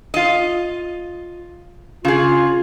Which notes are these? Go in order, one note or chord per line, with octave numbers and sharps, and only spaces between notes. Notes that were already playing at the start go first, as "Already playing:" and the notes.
F4 D#5
C#3 F4 G#4